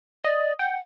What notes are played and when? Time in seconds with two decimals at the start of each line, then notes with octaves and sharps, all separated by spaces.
0.24 D5 D#5
0.59 F#5 G5